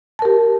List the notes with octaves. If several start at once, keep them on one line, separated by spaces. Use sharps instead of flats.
G4 A#4 A5